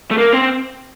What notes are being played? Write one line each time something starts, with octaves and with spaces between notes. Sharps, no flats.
A3
A#3
C4